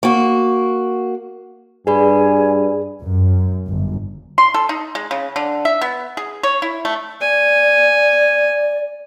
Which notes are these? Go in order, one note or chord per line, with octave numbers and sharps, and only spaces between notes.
A#3 F#4
G2 G#4 B4 D5 G#5 B5
F#2
G1
C6
A4
D#4
G#3
C#3
D3
E5
B3
G#4
C#5
E4
A3
D5 G#5